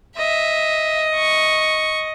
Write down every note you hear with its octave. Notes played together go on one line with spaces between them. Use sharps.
D#5 E5
C#6